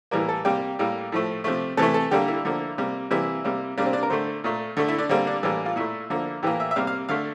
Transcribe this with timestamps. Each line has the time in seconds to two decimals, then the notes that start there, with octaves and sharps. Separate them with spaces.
0.11 A2 E3 G3 A#3 A#4
0.29 A4
0.45 C3 G3 A#3 G4
0.79 A2 G3 A#3
1.12 A2 F3 A3
1.44 C3 F3 A3
1.77 C3 E3 A3 A4
1.94 A4
2.11 D3 G3 A#3 G4
2.28 E4
2.45 D3 F3 A#3
2.78 C3 G3 A#3
3.11 C3 E3 G3 A#3 E4
3.44 C3 G3 A#3
3.78 C3 G3 A#3 D4
3.86 C4
3.93 D4
4.03 A#4
4.10 D3 A3 C5
4.44 A#2 A3
4.77 D3 A3
4.88 E4
4.98 D4
5.09 D3 G3 A#3 C4
5.27 D4
5.43 A2 E3 G3 A#3
5.66 F4
5.76 A#2 A3 E4
6.10 D3 F3 A#3
6.43 A2 E3 A#3 G4
6.60 E5
6.71 E5
6.76 C3 G3 A#3 F5
6.87 F5
7.09 D3 A3 F5